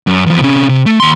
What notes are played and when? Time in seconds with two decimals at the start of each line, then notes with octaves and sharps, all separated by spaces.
0.07 F#2
0.26 E2 F3
0.42 C3 C#4
0.69 C3
0.86 A3
1.00 D#2 C6